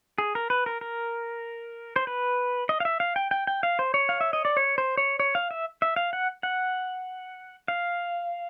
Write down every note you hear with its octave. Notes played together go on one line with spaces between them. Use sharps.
G#4
A#4
B4
A#4
A#4
C5
B4
D#5
F5
E5
F5
G5
G5
G5
F5
C5
C#5
F5
E5
D#5
D5
C#5
C5
C#5
C#5
F5
E5
E5
F5
F#5
F#5
F5